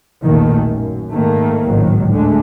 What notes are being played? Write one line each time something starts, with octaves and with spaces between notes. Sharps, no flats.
A#1 E2 B2 D#3 A3 A#3
F#2
G#2 D#3 A3 A#3
G#1 C#2 A2 D#3 F#3
D2 D3 G#3 A3